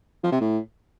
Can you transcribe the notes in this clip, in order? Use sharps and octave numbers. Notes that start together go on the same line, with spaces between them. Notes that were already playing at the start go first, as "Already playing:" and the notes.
F3
C3
A2